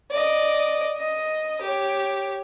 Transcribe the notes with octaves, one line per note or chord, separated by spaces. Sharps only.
D5 D#5
D#5
G4 C#5